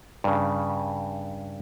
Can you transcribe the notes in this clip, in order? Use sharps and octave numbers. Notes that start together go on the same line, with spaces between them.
G2 C#3